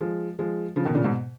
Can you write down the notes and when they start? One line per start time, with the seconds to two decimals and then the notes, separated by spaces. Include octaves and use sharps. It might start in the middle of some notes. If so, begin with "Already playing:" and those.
0.01 F3 G#3
0.39 F3 G#3
0.76 C#3 F3
0.85 B2 D#3
0.95 A#2 C#3
1.04 G#2 B2